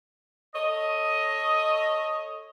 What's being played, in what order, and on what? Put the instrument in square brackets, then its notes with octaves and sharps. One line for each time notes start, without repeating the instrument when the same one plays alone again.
[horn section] A4 C#5 D#5